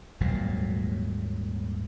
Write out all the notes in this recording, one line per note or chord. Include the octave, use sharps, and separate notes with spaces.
D#1 G#1 A#2 F#3